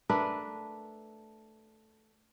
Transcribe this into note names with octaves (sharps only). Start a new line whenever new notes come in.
A3 D4 A#4 B4